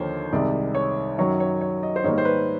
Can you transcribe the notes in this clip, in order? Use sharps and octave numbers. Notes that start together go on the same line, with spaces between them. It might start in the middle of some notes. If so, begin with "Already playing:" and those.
Already playing: D#2 D3 F3 C5 C#5
C2 C3 D#3 G#3 D5
C#5
F#2 D#3 F#3 C#5
C#5
C#5
D#5
C5
G#2 D#3 G3 A#3 C#5
C5
B4